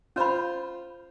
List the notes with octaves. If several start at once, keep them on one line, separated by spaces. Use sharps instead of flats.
C#4 F4 C5 B5